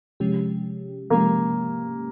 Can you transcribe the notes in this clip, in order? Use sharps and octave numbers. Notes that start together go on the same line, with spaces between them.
C3 F3 G#3 C#4 G4
C3 F3 G#3 A#3 C#4 G4